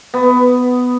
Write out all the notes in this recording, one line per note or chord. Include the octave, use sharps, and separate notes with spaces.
B3